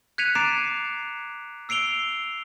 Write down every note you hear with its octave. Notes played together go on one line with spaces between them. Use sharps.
F#6 G#6 B6 C#7 D#7 F7
A#5 D6 A6 C7 D7 E7
E6 C7 D7 F7 G7